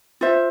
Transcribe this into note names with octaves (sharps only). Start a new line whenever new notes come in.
F4 C5 E5